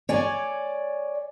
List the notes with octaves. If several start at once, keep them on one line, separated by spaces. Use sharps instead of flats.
C#5 D5 G#5